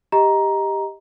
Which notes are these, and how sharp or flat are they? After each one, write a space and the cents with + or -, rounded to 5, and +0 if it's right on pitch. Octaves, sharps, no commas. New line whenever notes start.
G4 +10 D#5 +10 A#5 +10